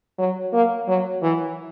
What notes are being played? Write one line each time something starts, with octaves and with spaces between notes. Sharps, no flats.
F#3
A#3
F#3
E3